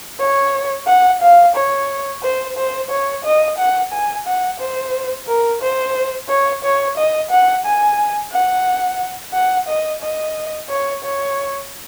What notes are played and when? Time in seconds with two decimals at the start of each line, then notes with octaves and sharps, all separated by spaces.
0.20 C#5
0.87 F#5
1.22 F5
1.55 C#5
2.23 C5
2.57 C5
2.90 C#5
3.24 D#5
3.58 F#5
3.92 G#5
4.27 F#5
4.60 C5
5.28 A#4
5.61 C5
6.29 C#5
6.64 C#5
6.97 D#5
7.31 F#5
7.65 G#5
8.32 F#5
9.34 F#5
9.68 D#5
10.02 D#5
10.69 C#5
11.04 C#5